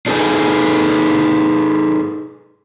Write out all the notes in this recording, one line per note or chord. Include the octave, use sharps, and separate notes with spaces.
D4 D#4 G#4 A4 B4 G#5